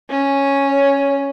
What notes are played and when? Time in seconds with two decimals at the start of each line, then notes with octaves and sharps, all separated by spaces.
0.10 C#4
0.68 C#5